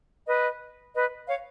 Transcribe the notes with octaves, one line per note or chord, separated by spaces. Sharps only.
B4 D#5
B4 D#5
C#5 F5